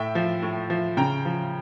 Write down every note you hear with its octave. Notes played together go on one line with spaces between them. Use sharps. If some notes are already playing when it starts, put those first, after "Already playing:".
Already playing: A2 E5 G5
F3
A2
F3
C#3 G5 A#5
F3